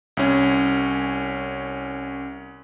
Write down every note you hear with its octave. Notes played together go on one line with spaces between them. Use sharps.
C2 C#4